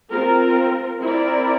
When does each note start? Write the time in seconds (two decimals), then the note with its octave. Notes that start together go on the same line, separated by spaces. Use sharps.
0.10 C4 F4 A#4
1.00 C4 E4 A#4 D5